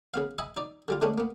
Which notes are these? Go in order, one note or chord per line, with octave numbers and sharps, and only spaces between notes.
C#3 B3 F5
D#5 E5 G#5 B5
D#4 D5
D3 G3 F4
D3 G#3 A3 B3 C#4 D4
A#3 B3